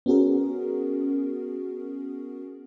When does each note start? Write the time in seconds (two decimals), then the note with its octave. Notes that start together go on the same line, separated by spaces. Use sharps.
0.06 B3 C#4 F#4 G#4 A#4